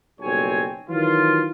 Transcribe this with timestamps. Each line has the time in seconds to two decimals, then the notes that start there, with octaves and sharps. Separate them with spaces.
0.20 F#1 B1 G3 C4 C#5 G#5
0.90 D#3 E3 F#3 F4